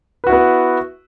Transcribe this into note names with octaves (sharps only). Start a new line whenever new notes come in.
B3 E4 F#4 B4